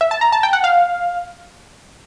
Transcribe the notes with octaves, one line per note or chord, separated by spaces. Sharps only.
E5
A5
A#5
A5
G5
F#5
F5